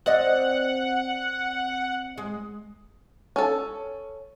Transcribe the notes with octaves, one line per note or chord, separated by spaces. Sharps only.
C4 D5 D#5 F#5
G#3
C#4 A4